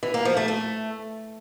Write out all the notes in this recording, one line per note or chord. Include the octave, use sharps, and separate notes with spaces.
E3
A#3
F3
A3
A3